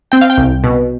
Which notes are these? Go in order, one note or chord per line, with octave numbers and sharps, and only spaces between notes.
C4 G5
F5
G5
C2
B2